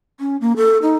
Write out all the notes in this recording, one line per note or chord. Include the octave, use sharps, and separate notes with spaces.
C#4
A#3
A4
D#4